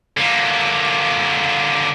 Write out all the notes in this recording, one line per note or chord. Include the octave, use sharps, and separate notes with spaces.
D3 A#3